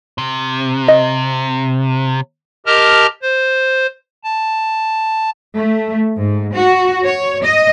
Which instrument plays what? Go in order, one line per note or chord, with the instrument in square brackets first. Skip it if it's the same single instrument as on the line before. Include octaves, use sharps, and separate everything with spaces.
[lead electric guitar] C3
[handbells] D#5
[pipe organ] G4 A#4 D#5 A5 A#5 F6
C5
A5
[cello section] A3
G#2
F#4
C#5
D#5